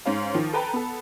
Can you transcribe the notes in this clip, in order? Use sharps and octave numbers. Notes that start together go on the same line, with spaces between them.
G#2 C#4 F5
D#3 F3
A4 B4 G5 A#5 B5
B3 A4